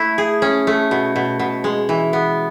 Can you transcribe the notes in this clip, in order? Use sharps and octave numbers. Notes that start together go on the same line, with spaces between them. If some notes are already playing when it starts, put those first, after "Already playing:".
Already playing: A3 E4
G#4
C#4
A3
B2
B2
B2
G#3
E3
B3